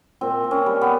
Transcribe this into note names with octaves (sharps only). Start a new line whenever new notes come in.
A#2 C4
A#2
C#4
G3
B3